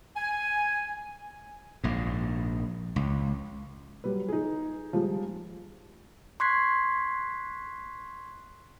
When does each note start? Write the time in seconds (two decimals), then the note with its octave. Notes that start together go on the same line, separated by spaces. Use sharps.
0.16 G#5
1.84 A#1 G#2
2.96 C#2
4.04 F#3 G3 B4
4.28 D#4 G#4
4.93 F3 G3 G#3
6.40 C6 C#6 F#6 G#6 B6 C7